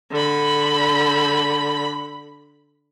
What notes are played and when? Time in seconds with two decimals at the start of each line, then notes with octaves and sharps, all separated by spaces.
0.12 D3 B5